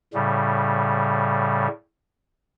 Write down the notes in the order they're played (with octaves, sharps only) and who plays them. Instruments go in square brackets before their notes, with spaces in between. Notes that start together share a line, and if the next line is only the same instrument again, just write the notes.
[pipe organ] A2 C#3 G3